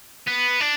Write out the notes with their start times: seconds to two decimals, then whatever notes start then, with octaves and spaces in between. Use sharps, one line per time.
0.27 B3
0.60 D4